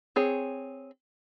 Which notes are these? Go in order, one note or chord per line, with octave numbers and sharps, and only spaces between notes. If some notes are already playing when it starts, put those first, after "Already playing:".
C4 G#4 C#5